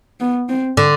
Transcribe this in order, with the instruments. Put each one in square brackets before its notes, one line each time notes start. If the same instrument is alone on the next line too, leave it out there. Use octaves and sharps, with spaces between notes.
[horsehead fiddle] B3
C4
[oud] D3